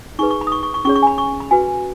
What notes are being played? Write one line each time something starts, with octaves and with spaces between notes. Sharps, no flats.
D#4 G#4 B4 C#6
C#6
B5
D#6
C#6
C#6
C#6
C#4 G#4 C#5 C#6
C#6
G#5
B5
C#6
B5
F#4 B4 G#5